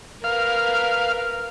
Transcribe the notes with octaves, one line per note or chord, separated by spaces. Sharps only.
A#4 B4 F5